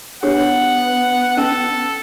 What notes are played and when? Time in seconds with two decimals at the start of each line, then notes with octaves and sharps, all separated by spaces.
0.23 B3 D4 G4 C#5 F#5
1.37 C#4 A4